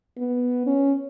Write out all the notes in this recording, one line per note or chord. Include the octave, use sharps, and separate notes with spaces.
B3
C#4